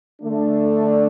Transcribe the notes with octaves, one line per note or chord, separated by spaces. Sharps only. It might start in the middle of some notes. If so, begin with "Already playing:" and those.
D3 A3 D4